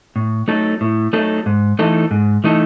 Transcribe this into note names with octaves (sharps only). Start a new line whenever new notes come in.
A2
F#3 A3 D#4 A4
A2
F#3 A3 D#4 A4
G#2
E3 A3 D#4 A4
G#2
E3 A3 D#4 A4